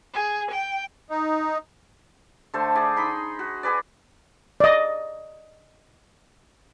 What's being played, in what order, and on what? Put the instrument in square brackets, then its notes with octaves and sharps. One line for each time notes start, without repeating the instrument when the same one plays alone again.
[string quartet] G#4
G5
[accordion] D#4
[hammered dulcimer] D3 A3 A4 C5
G#4 D5 E5
D#4 B5 C6
F#4
F#4 G#4 B4 D5
[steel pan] D5 D#5